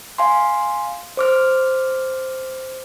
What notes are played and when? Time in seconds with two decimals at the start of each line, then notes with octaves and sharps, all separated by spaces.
0.18 F5 G#5 C6
1.17 C5 D6 F6